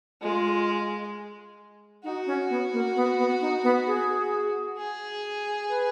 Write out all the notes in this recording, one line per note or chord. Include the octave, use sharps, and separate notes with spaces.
G#3 F4
D#4 F#4
C#4
B3
A#3
B3
B3
D#4
B3
G#4
G#4
B4